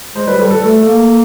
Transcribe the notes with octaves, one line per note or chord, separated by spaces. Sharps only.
G#3 C5
G3 B4
G3 A4
A4
A3 A4
A#3